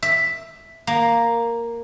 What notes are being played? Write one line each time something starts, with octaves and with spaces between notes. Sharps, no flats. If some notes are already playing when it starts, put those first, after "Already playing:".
E5
A#3